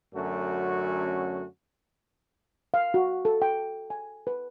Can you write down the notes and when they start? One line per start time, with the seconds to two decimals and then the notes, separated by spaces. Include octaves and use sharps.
0.14 F#2 D3 F#3 A3 C#4 F#4
2.74 F5
2.94 F#4
3.25 A4
3.42 G5
3.90 G#5
4.27 B4